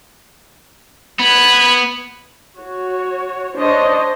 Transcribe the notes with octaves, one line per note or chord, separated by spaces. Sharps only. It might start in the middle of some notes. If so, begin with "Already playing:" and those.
B3 B5 F#6 G#6
F#4 C#5
D4 C5 C#5 D#5